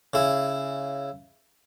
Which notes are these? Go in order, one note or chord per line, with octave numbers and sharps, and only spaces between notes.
C#3 E4